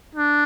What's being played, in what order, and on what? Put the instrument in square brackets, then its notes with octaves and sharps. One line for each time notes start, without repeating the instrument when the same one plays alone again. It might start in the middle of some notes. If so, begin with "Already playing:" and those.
[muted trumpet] D4